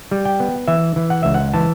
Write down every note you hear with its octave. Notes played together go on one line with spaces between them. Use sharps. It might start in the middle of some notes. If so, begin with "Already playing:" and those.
G3
G5
B3
E3 E5
E3
F#5
C#2 E5
F#5
E3 A5